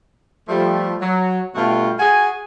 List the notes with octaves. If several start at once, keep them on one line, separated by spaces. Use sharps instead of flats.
F3 G3 A3
F#3
G2 B2 A3 F4 F#4 G5
F#4 G#4 G#5